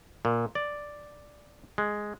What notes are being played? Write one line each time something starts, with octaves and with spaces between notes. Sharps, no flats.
A#2
D5
G#3